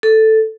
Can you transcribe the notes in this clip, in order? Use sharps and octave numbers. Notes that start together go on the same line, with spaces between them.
A4